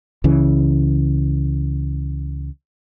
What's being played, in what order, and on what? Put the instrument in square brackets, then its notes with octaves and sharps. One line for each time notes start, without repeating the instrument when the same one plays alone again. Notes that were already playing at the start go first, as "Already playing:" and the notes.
[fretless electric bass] C#2 C#3 E3